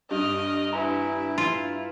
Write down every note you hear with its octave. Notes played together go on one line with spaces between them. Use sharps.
G2 D#5 F6
E4 B4 G#5 A#5
F4